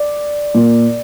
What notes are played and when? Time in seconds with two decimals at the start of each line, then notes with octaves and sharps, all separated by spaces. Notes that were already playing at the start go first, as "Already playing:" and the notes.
Already playing: D5
0.55 A#2